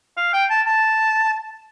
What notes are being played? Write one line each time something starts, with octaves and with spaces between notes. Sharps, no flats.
F5
G5
A5
A5